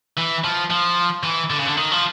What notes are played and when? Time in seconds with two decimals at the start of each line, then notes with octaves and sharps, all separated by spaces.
0.17 E3
0.44 F3
0.70 F3
1.23 E3
1.50 D3
1.58 C#3
1.65 D3
1.77 D#3
1.92 F3